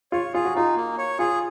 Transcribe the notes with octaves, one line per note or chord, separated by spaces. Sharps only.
F4 C#5
F4 G#4
F#4
D#4 F4
A#3
C#5
F4 G#4